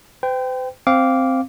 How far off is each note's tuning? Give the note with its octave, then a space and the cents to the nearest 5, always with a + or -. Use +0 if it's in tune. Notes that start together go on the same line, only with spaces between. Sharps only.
C5 -45 G5 +0
C4 +0 F5 +0 D6 -15